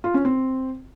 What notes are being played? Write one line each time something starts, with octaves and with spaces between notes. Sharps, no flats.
F4
C#4
C4